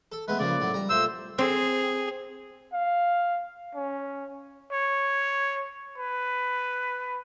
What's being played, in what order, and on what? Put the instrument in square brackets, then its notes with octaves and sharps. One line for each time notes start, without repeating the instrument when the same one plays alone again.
[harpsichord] A4
[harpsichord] G#3 A3 B3 [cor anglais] B4
[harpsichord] C#3 F3 A#3 [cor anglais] D5
[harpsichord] A2 F#3
G3 A#5
[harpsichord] A#2 A3 [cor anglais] C5 [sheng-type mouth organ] E6
[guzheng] C4 [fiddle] G#4
[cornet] F5
C#4
[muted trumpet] C#5
B4